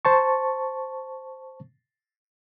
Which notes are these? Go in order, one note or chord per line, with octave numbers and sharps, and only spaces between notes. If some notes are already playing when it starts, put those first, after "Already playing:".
C5 A5 C#6